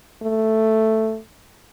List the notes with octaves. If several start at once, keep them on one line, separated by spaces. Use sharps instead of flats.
A3